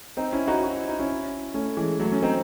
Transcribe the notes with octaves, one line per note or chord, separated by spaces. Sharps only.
C4 D#4
C#4 E4
D#4 F#4
F#4
E4
D#4
C#4 E4
A3 C#4
E3 G#3
F#3 A3
A3 C#4
C4 D#4